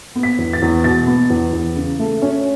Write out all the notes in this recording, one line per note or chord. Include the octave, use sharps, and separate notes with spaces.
B3
B6
E2
A6
E2
B2 A6
B3
E2
E2
C#3
A3
C#4